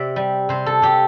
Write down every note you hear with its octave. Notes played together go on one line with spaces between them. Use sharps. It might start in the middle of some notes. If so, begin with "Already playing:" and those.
Already playing: C3 D5 E5
G3
C3 C5
A4
C3 G4